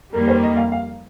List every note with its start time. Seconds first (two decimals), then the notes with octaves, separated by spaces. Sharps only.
0.13 F2 D#3 G3 A#3 A#4
0.28 C5
0.43 D#5
0.57 F5
0.72 F5